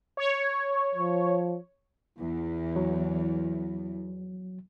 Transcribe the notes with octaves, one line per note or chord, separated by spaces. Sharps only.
C#5
F3
E2 E4
F#3